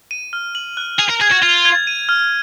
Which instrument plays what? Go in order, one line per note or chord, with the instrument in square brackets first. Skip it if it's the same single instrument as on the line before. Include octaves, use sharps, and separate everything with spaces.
[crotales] D#7
F6
F#7
F#6
[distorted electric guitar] G#4 [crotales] F7
[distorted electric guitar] A#4
[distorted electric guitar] G#4 [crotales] G#6
[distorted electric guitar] F#4
[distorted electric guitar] F4 [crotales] F7
[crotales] G#6
D#7
F6